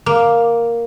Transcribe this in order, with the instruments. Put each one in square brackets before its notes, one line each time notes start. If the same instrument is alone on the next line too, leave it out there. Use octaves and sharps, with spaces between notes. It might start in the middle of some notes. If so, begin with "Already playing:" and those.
[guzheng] A#3